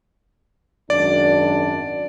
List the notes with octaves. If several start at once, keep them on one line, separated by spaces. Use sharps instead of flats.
G#1 F#2 D4 D5